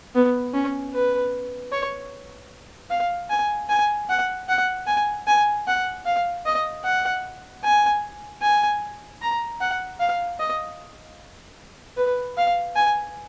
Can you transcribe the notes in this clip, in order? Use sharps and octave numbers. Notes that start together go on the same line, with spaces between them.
B3
C#4
B4
C#5
F5
G#5
G#5
F#5
F#5
G#5
G#5
F#5
F5
D#5
F#5
G#5
G#5
A#5
F#5
F5
D#5
B4
F5
G#5